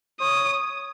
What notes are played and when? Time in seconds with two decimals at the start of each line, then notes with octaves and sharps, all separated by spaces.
0.20 C#5 D#6